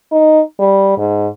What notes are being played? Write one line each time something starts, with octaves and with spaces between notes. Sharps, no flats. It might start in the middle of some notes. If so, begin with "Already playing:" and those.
D#4
G3
G#2